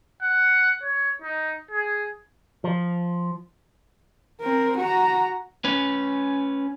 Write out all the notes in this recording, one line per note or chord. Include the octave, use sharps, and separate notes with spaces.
F#5
C#5
D#4
G#4
F3
C4 A#4
F#4 A#5
C#4 B4